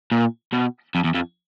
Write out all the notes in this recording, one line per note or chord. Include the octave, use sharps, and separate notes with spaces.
A#2
B2
F2
E2
F2